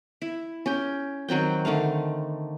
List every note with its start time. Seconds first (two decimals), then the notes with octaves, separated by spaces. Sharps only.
0.22 E4
0.66 C#4 G4 G5
1.28 D#3 F#3 C4 G5
1.65 D3 D#3 A3 F5